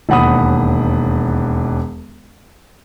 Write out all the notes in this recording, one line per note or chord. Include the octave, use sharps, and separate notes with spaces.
E1 D#2 F#5 B5 D#6